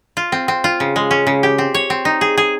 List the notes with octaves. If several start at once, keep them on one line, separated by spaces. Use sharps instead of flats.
F4
C4
C4
F4
C#3
G#3
C#4
C#3
G4
C4
C#5
C4
D#4
G#4
G#4